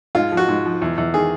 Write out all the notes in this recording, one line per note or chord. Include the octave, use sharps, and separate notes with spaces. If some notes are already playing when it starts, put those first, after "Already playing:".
G#2 F4
F3
F#4
G#2
F3
E2
E2
D#3 G#4